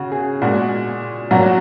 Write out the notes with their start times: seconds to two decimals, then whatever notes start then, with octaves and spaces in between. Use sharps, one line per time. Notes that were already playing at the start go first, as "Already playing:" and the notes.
Already playing: C#3 F#4
0.12 G#4
0.42 A#2 G#3 F#4
1.31 A#2 F#3 F#4